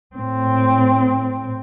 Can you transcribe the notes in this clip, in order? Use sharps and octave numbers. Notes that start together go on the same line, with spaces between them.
A2 C4